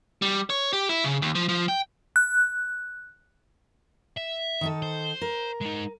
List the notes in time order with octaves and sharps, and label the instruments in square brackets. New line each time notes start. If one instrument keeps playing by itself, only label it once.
[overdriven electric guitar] G3
C#5
G4
E4
C#3
D#2
F3
F3
G5
[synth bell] F#6
[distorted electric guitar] E5
[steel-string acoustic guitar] D#3 D#4 A4
[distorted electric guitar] C5
[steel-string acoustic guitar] A#4
[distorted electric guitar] G#3 D#4